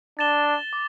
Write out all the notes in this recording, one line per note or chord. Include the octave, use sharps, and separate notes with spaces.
D4 A6 E7 G7
D6